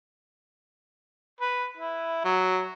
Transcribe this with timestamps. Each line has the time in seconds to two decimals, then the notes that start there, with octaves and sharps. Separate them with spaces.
1.41 B4
1.78 E4
2.25 F#3